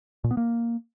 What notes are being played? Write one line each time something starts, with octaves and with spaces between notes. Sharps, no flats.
A#2
B3
A#3